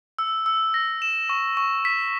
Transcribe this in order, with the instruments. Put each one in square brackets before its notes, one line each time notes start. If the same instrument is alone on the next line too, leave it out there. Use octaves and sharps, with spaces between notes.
[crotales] E6
E6
A#6
E7
C#6
C#6
B6